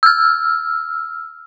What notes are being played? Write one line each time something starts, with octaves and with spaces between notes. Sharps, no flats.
E6 F6